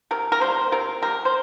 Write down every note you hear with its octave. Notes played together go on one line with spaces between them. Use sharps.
C3 A#4
A#4
G3 A#3 C5
C3 A#4
G3 A#3 A#4
C5